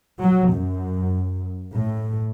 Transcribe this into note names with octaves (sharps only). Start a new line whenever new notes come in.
F#3
F#2
A2